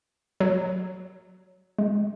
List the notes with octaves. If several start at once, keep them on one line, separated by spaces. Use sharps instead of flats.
F#3
G#3